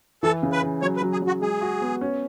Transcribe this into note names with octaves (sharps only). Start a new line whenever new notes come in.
E3 A4
C#3
B4
C#3
F#3 C#5
B4
F#3
G#4
F#3
F#4
G#3 G#4
F#4
B3
C#4